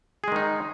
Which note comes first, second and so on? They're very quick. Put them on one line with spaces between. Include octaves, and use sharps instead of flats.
G#4 G#3 D#3 D#4